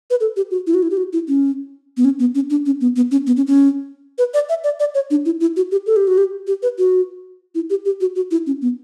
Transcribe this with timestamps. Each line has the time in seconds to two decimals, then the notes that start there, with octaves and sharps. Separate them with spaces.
0.10 B4
0.21 A4
0.36 G4
0.51 F#4
0.67 E4
0.74 F#4
0.83 E4
0.90 G4
0.97 F#4
1.13 E4
1.28 C#4
1.97 B3
2.05 C#4
2.19 B3
2.35 C#4
2.50 D4
2.66 C#4
2.81 B3
2.96 B3
3.11 C#4
3.27 B3
3.37 C#4
3.47 C#4
4.18 B4
4.34 D5
4.49 E5
4.64 D5
4.80 D5
4.95 C#5
5.11 D4
5.25 E4
5.41 E4
5.57 F#4
5.71 G4
5.86 A4
5.96 G4
6.07 F#4
6.18 G4
6.47 G4
6.63 B4
6.78 F#4
7.55 E4
7.70 G4
7.85 G4
8.01 F#4
8.16 F#4
8.31 E4
8.47 C#4
8.62 B3